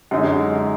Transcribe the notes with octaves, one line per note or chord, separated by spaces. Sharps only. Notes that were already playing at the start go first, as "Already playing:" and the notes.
F#2 D3 G#3 D#4